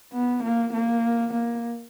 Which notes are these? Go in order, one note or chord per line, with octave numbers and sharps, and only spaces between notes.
B3
A#3
A#3
A#3